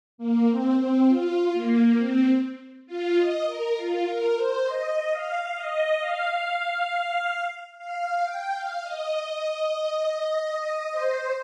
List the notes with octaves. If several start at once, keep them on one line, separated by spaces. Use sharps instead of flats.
A#3
C4
C4
F4
A#3
C4
F4
D#5
A#4
F4
A#4
C5
D#5
F5
D#5
F5
F5
G5
F5
D#5
C5